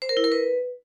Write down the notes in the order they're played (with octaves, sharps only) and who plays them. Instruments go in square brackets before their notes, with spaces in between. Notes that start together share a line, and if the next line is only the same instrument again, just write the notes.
[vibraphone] C5
A#4
E4
A#4
B4